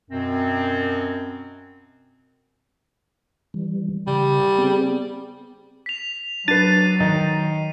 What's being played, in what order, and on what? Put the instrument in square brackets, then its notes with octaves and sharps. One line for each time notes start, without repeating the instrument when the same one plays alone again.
[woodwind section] F#2 B2 C4
[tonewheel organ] E3 G3
[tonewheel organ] C#3 [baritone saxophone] G3
[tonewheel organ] B3 C4 G#4
[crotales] B6 F7
[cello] F#3 [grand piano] D4 B4 [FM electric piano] A6 [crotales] C7 D#7
[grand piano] D#3 D#4